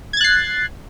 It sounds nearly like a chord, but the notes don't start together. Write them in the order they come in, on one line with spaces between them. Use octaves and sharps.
G#6 A6 F#6 C7